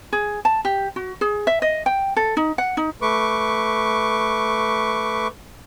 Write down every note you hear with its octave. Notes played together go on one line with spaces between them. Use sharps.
G#4
A5
G4
F#4
G#4
E5
D#5
G5
A4
D#4
F#5
D#4
A3 B4 C#6 D6